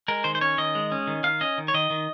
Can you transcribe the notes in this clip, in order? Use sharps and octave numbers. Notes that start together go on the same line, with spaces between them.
G#3 A#4
D#3 C5
C5
C#4 C#5
D#3 D#5
G#3
C#4
D#3
D#3 F5
C#4 D#5
D#3
C#5
D#3 D#5
D#3